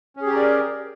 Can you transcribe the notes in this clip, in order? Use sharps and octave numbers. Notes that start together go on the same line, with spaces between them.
C#4 G4 G#4 A#4 D5